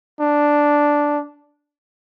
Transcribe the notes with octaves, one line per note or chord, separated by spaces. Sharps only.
D4